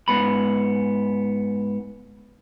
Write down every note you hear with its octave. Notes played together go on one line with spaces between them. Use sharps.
G#2 B3 B5